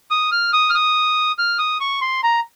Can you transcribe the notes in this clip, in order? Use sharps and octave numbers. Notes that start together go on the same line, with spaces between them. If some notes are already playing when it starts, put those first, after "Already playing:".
D#6
F6
D#6
F6
D#6
F6
D#6
C#6
C6
A#5